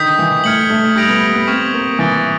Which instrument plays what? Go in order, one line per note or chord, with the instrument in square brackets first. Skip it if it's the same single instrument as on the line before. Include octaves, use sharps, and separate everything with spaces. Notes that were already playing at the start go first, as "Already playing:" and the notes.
Already playing: [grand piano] D3 D#3 [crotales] D#6 G6 B6
[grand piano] E3
[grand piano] A3 [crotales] F6 G#6 C#7 F#7
[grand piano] A3
[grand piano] G3 [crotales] D#6 G6 A#6 D7 F7
[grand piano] B3
B3
[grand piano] C4 [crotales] C#6 F6 G#6 B6 E7
[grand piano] A#3
[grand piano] E3 [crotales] D#6 F#6 A6 D7 G7